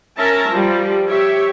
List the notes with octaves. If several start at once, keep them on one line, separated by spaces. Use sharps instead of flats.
C#4 A#4 E5 A5 A#5
F3 G3
G4 C#5 E5